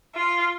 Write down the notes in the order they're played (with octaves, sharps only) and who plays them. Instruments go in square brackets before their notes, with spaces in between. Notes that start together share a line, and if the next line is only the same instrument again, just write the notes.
[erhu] F4